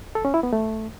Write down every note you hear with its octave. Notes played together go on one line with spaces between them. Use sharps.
A4
C#4
E4
B3
A3